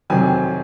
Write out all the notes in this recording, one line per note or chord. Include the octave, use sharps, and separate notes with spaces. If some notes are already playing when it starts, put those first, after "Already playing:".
F2 C3 D#3 F#3 C4 G#5